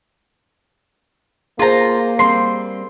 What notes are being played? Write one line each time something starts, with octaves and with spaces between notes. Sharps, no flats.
A#3 F4 G#4 C5 A#5
G3 C4 C6